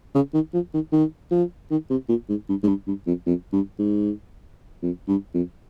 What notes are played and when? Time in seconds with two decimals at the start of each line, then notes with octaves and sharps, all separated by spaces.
0.15 C#3
0.34 D#3
0.54 F3
0.74 D#3
0.92 D#3
1.31 F3
1.71 D#3
1.90 C3
2.09 A#2
2.29 G#2
2.49 G2
2.63 G#2
2.68 G2
2.87 G2
3.07 F2
3.26 F2
3.52 G2
3.79 G#2
4.82 F2
5.08 G2
5.34 F2